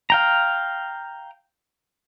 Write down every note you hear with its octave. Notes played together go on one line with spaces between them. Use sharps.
F5 G5 A#5